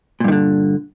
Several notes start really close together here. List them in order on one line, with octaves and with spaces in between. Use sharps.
A#2 G2 D#3 D3